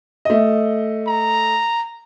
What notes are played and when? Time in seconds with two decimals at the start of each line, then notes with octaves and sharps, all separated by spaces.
0.25 A3 D#5
1.08 A#5